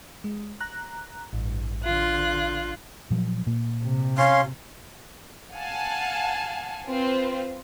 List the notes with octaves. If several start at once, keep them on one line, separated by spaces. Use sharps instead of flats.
G#3
A#5 F#6
A1 G2
D3 F4 F#6
A#2 F3 F#3
A#2 A#3
C3
C#4 F5 C6
F5 F#5 G#5 A5
C4 F4 B4 C5